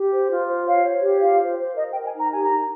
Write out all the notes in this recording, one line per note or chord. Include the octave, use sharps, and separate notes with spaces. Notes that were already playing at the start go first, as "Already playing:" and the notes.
Already playing: G4
C5
F4
C5
C#5 F5
C#5
G4
F4 F5
C5
C5
A#4 D#5
G5
A#4
G5
G#5
D#4 A#5
G4 G#5
A#5
D#4